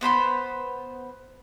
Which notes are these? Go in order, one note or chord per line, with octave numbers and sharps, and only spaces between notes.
B3 C5 B5 C6